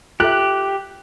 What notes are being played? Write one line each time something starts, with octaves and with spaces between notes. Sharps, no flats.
F4 G4 A4 E5 F#6